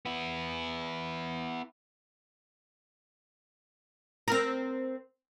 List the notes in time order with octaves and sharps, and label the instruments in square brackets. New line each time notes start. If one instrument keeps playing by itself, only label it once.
[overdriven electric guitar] B3 E4
[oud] C4 A#4